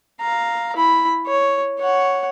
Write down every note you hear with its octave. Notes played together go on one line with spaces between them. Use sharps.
F5 A#5
E4 B5
C#5
C#5 F#5